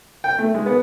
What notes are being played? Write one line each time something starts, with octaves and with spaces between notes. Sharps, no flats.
G5
A3
G#3
B3